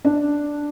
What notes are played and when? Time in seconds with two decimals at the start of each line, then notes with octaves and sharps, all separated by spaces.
0.05 D4